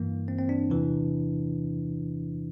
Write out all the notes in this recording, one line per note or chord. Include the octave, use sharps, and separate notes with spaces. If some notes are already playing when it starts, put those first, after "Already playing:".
Already playing: G2 E3 A#3
C4
C4
D4
E2 C3 E3